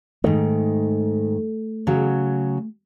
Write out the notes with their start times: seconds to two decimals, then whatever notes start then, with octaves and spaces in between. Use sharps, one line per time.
0.24 G#2 D#3 A3
1.87 C#3 F#3